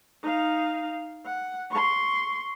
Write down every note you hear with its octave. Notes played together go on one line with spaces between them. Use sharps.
D#4 F5
F#5
C6 C#6